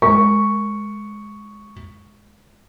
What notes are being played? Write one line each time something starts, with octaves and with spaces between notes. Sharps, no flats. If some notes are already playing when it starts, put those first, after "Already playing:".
G#3 A#4 C#6